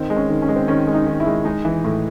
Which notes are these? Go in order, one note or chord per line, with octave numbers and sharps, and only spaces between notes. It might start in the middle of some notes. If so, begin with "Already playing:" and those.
Already playing: D#3 C4
G#3
C#4
D#3
C#4
G#3
C4
D#3 C#4
G#3
D#4
D#3
E4
G#3
G#3 D#4
E3
A2